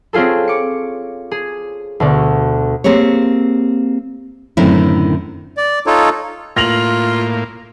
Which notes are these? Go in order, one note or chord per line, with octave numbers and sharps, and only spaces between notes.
C4 C#4 F4 G#4 A4
D6 C#7
G#4
D2 B2 D4
A#3 C4 G4 G#4 C#5
F#2 A2 D3 D#3 C4 E4
D5
D#4 F4 A4 C#5
A2 A#3 F4 A#6 F7 F#7